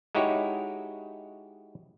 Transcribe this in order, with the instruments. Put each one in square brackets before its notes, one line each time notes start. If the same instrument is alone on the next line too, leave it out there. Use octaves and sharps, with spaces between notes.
[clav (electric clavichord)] G#3 D#4 E4 F#4 G4 C#5